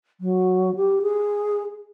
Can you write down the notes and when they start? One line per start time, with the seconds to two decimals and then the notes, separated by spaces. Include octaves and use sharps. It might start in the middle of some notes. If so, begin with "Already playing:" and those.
0.21 F#3
0.76 G4
1.02 G#4